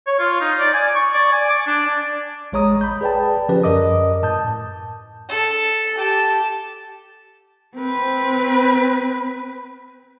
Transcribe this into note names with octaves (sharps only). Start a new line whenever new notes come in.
C#5
F4
D#4
D5
G#5
C#6
D5
G#5
D6
D4
D5
A1 G#3 C#5 A#5 D#6
B5 G6
G#4 B4 D5 G5 A5
D3 F3 C#4 G4 B4 D5
F#2 A#4 D#5 D6 D#6
A2 A5 D#6 G6
A4
G4 A5
C4 B4